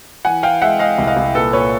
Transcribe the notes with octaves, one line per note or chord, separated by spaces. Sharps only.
E3 F#5 G#5
E3 F5 G5
G#3 E5 F#5
G#3 D#5 F5
C2
D#5 F5
C2
A#2 A4 B4
A#2 B4 C#5